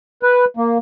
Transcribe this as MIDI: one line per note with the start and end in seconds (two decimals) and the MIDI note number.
0.23 0.45 71
0.57 0.78 58